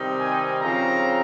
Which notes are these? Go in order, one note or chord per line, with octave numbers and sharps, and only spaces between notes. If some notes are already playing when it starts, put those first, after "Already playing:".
Already playing: C3 D#3 G3 C4 D#4
G#5
C#3 F3 C4 A#5